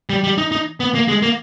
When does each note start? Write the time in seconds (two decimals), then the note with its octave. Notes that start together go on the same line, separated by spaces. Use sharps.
0.10 G3
0.24 G3
0.38 D#4
0.52 D#4
0.80 B3
0.94 A#3
1.08 G#3
1.22 A#3